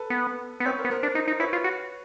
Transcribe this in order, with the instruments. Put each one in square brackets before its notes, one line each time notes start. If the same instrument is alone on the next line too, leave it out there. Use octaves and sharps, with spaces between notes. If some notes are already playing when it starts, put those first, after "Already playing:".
Already playing: [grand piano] A4 B4
[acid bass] B3
B3
[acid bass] C4 [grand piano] B4 C#5
[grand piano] A#4 C5
[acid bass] B3
[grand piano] A#4 C5
[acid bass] D4
D#4
D#4
[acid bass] E4 [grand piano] B4 C#5
[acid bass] F4
F#4